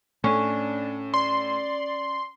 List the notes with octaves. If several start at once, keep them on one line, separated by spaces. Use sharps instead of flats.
A2 C#4 D4
D5 C6